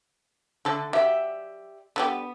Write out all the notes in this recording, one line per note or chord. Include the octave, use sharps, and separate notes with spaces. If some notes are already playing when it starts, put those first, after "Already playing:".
D3 A3 A4
F#3 G4 D5 E5
D3 G3 B3 G4